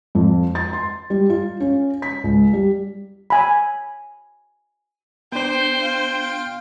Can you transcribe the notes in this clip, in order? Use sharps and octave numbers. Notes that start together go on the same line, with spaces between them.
F2
A6
C6
G3
F4
C#4
B6
C#2
G3
G#5 B5
B3 D4 C5 G5
F4